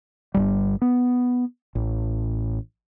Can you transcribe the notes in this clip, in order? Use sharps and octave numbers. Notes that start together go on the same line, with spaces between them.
G1 D#2 G3
B3
A1